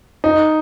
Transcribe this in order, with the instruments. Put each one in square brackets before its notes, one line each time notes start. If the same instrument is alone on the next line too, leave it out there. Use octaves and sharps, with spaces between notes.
[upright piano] D#4